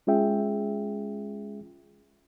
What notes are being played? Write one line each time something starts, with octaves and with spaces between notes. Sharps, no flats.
G#3 C#4 F4 G#4 E5 G5